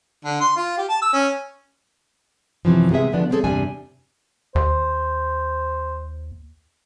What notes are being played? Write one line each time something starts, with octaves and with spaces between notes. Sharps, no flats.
D3
C6
F4
G4
A5
E6
C#4
F#2 C3 E3 F3
C3 G#3 B3 G#4 E5
D3 F3 A3 B3 D4
C#3 G3 C4 D4 G#4 A4
E2 G2 C3 G3 D4 G#5
D#2 C5